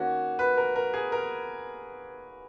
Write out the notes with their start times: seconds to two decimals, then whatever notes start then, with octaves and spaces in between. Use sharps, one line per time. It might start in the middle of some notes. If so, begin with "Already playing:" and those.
Already playing: D#3 A#3 C#4 F#4
0.39 B4
0.57 A#4
0.76 A#4
0.94 G#4
1.12 A#4